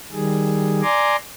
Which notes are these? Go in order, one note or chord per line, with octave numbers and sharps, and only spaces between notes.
D#3 G3 G#4
D5 G#5 A#5 C6 D6